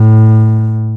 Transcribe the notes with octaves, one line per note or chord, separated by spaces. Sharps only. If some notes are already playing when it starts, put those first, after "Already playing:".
Already playing: A2